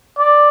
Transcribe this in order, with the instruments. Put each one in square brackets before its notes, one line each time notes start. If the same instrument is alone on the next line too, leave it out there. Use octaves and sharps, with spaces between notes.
[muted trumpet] D5